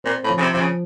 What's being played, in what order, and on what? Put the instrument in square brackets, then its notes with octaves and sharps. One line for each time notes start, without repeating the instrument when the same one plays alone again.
[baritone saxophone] A#2 [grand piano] C4
[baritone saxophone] A2
[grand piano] F3
[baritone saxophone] C#3
C3
[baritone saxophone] C3 [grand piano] F3
[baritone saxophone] C#3